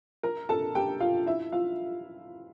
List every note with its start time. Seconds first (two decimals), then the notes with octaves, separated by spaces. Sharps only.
0.23 A#4 A#5
0.49 A4 A5
0.75 G4 G5
1.00 F4 F5
1.26 E4 E5
1.52 F4 F5